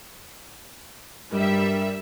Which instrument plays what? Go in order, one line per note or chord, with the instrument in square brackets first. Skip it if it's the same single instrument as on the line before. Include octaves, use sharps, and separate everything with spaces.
[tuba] G2 [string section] G3 E5 [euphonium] A#4